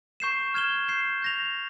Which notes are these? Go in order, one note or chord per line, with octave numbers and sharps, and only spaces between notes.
C#6 G6 C7 E7
F6 G#6 E7 G7
G6 C7 E7
G6 A#6 F7